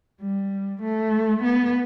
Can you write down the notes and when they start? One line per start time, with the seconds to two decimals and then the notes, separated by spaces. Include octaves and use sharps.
0.21 G3
0.82 A3
1.43 B3